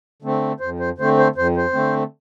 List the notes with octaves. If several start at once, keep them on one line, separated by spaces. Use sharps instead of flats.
D3 A3 C4
F2 C5
C5
D3 A3 C4 C5
C5
F2 C5
C5
D3 A3 C4